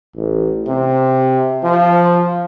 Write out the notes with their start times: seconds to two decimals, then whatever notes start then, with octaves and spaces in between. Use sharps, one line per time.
0.16 A1
0.67 C3
1.64 F3